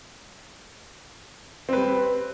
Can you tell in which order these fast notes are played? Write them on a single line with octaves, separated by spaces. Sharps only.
C4 B4 G3